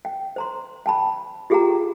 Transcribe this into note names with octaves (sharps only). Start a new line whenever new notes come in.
G5
C5 A#5 C6
G5 A5 B5
F4 G4 G#4 F#5 G5 A#5